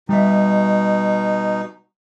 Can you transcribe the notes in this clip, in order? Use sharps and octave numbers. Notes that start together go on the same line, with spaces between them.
B2 G3 D#4 E5